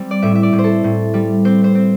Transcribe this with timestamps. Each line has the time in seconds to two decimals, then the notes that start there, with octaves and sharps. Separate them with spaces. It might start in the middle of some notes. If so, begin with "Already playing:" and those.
Already playing: G3 C4
0.11 D5
0.22 A2 E5
0.35 E5
0.43 D5
0.53 A2
0.59 C5
0.64 A4
0.84 A2
1.14 G3
1.45 C4 C5
1.64 C5
1.75 C4